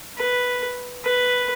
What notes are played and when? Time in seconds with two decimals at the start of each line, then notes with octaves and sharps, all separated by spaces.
0.18 B4
1.04 B4